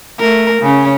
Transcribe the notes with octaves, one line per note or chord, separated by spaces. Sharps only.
A3 A#4
C#3 C#4